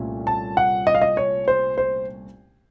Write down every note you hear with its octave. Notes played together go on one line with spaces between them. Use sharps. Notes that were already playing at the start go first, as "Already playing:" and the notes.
Already playing: C2 A#2 A3 C#4
A5
F#5
D#5
F5
D#5
C#5
C5
C5